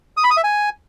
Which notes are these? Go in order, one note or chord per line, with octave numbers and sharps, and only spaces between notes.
D#6
B5
D#6
E5
G#5